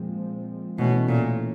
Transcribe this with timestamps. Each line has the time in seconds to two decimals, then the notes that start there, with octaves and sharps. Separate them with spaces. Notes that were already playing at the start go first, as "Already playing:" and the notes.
Already playing: A#2 F3 G#3 C4
0.78 B2 E3 A3 C#4
1.08 A#2